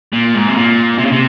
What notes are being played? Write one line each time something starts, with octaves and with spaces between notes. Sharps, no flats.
A#2
G#2
C3
A#2
C3
C#3
C3